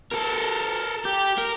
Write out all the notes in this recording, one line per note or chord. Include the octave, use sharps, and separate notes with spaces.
A4 A#4
G4
A#4